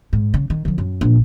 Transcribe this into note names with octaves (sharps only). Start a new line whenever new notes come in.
G#2
C#3
D#3
D3 F3
F#2
A#1